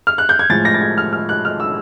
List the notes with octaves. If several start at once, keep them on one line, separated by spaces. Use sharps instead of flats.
F6
F#6
G6
G#6
A2 F3 G#3 A6
A#6
A6
G#6
F6
F6
F#6
F6
E6